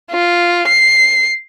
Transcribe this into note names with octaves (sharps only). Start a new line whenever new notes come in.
F4
C7